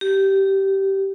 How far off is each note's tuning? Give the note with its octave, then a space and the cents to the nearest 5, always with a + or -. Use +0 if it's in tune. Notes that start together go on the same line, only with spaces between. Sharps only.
G4 -15